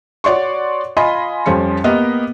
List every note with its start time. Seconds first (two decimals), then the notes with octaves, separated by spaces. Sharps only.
0.24 F#4 C#5 D5 C6 C#6
0.97 F4 D#5 G#5 B5 C6
1.46 F2 F3 G3 C#4 C#7
1.84 A#3 B3 G4 D#5